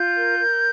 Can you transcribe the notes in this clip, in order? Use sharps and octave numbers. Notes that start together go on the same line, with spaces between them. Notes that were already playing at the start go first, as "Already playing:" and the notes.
Already playing: F4 G6
A#4
A#4